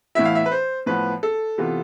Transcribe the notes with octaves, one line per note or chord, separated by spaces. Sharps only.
A2 E3 B3 E4 E5
F5
E5
B4
C5
A2 F3 B3 B4
A4
C3 E3 B3 F4